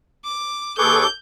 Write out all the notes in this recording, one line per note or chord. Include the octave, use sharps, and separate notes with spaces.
D6
D#2 G#4 A4 B4 C#6 D6 G6